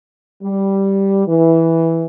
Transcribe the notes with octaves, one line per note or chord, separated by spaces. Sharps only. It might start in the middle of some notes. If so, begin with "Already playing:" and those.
G3
E3